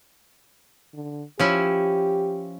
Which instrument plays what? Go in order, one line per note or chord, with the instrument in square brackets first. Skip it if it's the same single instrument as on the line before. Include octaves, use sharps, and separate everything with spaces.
[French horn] D3
[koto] F3 C#4 E4 [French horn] G4